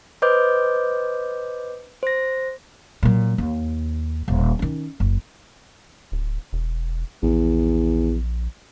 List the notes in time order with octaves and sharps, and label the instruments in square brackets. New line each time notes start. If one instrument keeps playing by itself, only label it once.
[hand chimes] B4 C5 D#5 D6 G6
C5 A#6
[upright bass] A#2 F#3
D#2
D#1
D#3 C#4
F#1
[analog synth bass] D1
E1
[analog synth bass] A#1 [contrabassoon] E2